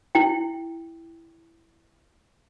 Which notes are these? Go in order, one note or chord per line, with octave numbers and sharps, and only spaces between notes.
E4 G5